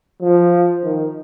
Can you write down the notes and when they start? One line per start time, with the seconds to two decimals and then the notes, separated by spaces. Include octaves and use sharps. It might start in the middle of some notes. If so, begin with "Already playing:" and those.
0.21 F3
0.84 D#3